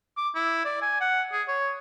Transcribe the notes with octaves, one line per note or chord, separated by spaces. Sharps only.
D6
E4
D5
G#5
F#5
G#4
C#5